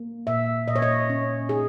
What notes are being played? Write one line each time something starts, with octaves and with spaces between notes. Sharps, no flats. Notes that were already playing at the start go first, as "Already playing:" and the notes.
Already playing: A#3
A#2 E5
A#2 D#5
C#5
D#5
C#4
D#4 G#4